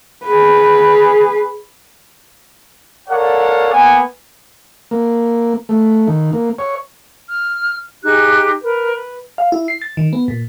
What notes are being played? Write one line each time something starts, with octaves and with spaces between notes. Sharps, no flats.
G#4 B4
A4 A#4 C#5 D5 F5 F#5
A#3 B3 F#5 G#5
A#3
A3
D#3
A#3
C#5
F6
D#4 G4 G#4 F#6
A#4 B4
B4
F5
E4
C7
A6
D#3
B3
A#2